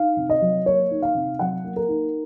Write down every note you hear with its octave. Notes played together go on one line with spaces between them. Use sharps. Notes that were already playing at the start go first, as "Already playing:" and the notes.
Already playing: D#4 F5
C3
D#5
F#3
A#3 C#5
D#4
F5
C3
F#3 F#5
A#3
A#4
D#4